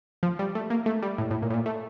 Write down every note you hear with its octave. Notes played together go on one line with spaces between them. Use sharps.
F3
G3
A3
A#3
A3
G3
A2
A2
A#2
A2
A#2
A3